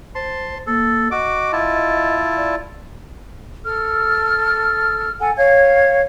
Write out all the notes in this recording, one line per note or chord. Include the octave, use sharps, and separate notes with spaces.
C5 A5 C6
A#3 A4
F#4 D#5 D6
E4 F4 A5
D5
A4 F6
A4 F#5 G#5
C#5 F5 G#6